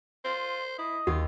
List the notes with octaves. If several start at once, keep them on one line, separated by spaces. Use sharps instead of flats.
F4 C5
E4 D#5
D#2 F4 F#4